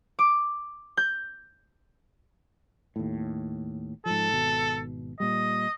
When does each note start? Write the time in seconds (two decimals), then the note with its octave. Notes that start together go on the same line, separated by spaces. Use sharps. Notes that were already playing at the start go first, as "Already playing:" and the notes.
0.19 D6
0.97 G6
2.96 D#2 A2
4.06 G#2 F3 A4
4.32 G#1 B2
5.20 A#2 G3 D#5